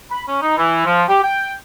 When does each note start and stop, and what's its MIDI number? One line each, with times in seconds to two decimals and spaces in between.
0.10 0.23 83
0.28 0.38 61
0.40 0.52 63
0.56 0.83 52
0.85 1.02 53
1.08 1.18 67
1.22 1.53 79